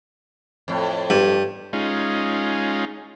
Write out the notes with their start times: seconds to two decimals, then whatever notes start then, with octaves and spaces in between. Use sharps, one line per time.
0.68 F2 A2
1.10 G2
1.73 G#3 C#4 D#4 F4